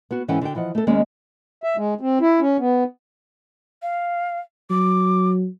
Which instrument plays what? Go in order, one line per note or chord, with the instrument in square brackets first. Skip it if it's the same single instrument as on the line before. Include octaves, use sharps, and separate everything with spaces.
[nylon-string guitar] B3 F#4
G#2 E3 C#4 A4 F#5 G5
D3 F#4 G5
E3 F3 D#5 F#5
A3 A4
D#2 G#3 A#3 C#4 D5 D#5
[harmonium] E5
G#3
C4
E4
C#4
B3
[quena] F5
[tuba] F#3 [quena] D6